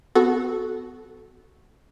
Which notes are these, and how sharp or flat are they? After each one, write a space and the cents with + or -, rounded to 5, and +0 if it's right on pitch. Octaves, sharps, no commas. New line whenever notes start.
B3 +30 F#4 +0 A4 -15